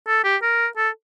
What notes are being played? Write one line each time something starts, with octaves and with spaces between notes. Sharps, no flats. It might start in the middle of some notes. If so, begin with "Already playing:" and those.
A4
G4
A#4
A4